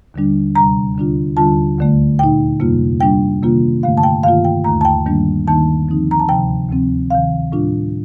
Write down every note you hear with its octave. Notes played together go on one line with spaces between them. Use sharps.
D#2 D3 G3 D4
D2 C3 G3 A#5
D#2 D3 G3 D4 F4
D#2 D3 G3 D4 F4 A5
D2 D3 A3
A#2 A3 D#4 G5
F2 C3 G3 A#3 F4
C3 G3 D4 G5
C3 D#3 A#3 F4
G2 D3 A3 F5
A5
G5
G2 D#3 A#3 F4 F5
G5
D#2 D3 A3 A#5
A5
G5
G2 D#3 G3 A#3 D4
D#2 D#3 A#3 D#4 A5
D3 F3 C4 D#4
A#5
A5
D2 C3 F3 G5
D2 C3 F3 C4
D2 C3 D#3 F5
A2 G3 D4 F4